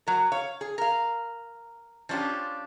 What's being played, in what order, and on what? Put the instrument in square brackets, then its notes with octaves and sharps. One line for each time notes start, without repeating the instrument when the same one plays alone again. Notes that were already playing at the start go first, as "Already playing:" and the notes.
[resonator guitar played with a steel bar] F#3 A#4
C#5 F5
G#4
A#4 F5
F3 C#4 D4 F4 G4